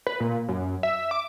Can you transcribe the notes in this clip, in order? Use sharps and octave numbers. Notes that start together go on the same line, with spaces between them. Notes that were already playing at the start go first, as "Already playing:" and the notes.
B4
A#2
F#2
E5
D6